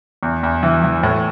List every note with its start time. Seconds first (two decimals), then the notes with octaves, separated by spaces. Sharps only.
0.23 E2
0.43 E2
0.63 E3
0.84 E3
1.03 A2